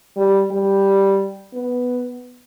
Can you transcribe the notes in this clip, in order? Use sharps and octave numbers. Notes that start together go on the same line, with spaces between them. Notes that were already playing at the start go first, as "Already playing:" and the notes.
G3
G3
B3